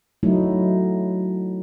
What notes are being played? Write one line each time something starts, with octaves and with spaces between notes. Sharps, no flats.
F#3 A3 D#4 E4